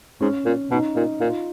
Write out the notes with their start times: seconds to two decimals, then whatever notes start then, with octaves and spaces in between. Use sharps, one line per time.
0.21 G#2 C#4
0.45 A#2 C#4
0.71 B2 D#4
0.95 A#2 D#4
1.20 A#2 F4